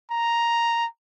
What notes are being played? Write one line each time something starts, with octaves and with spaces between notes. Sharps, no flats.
A#5